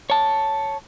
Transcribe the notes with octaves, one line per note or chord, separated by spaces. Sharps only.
C#5 A5